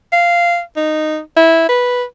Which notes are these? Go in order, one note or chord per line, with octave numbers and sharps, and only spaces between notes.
F5
D#4
E4
B4